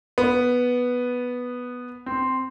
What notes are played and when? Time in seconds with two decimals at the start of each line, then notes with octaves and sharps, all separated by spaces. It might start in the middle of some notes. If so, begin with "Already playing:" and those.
0.18 B3
2.06 C4